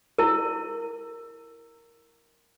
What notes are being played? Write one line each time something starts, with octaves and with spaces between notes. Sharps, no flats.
E4 A#4